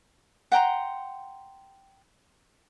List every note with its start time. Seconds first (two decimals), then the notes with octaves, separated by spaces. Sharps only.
0.52 F#5 G5 A#5 C6